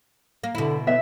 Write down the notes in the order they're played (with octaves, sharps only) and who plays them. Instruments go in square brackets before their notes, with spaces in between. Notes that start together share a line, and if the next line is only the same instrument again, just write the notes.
[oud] A#3
[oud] B2 E4 [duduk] D3
[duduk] B3 [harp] E5